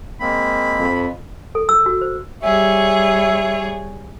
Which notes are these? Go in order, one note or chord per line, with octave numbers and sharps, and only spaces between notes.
G#3 A#3 C4 B5
F2
A4
E6
F#4
C5
G3 G#4 C#5 E5